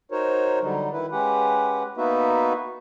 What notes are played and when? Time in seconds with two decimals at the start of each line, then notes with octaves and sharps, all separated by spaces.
0.11 D#4 F#4 A#4 C5 C#5
0.62 D3 F#3 G3 D#4
0.92 D#3 E4 B4
1.12 G#3 C#4 G4 B4 F#5
1.97 A#3 B3 D#4 F#4 B4 E5